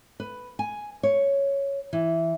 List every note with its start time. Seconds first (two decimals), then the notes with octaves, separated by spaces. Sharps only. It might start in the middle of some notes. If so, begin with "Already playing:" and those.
0.20 B4
0.59 G#5
1.03 C#5
1.93 E3